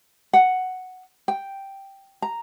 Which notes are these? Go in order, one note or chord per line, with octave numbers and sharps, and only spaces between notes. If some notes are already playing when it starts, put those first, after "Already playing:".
F#5
G5
A#5